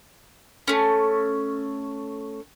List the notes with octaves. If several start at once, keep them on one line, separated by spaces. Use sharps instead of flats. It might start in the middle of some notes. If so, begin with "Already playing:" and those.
A3 C#4